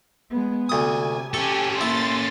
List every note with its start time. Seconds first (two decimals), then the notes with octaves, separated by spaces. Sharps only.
0.30 G#3 B3
0.69 D2 C3 G#5 D#6
1.34 C#4 G4 A4 G#5 C#6
1.81 A#3 E4 C6 A6